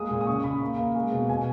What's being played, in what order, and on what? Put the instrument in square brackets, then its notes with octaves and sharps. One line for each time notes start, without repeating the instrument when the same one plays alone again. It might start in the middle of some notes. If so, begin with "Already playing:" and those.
Already playing: [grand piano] G#3 A#3 D#6
A#2
D#6
C#3 C#6
C#3 B5
A#3
A#3
G#3
B2
B2 G#5